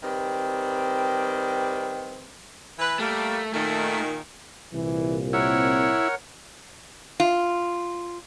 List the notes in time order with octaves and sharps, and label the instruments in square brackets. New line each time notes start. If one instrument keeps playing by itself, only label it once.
[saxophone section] D#3 G3 C4 B4
E3 B4
[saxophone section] G3 A#3 [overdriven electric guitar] A3
[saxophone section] A#2 D#3 [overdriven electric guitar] A3
[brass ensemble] C2 A#2 [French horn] E3
[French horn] C4 [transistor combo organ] E4 [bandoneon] A#4 C#5 F#5
[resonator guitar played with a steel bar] F4